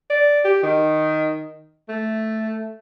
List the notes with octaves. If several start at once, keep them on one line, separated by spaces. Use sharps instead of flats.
D5
G4
D#3
A3